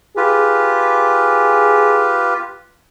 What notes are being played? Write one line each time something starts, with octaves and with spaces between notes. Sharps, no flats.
F4 G4 G#4 B4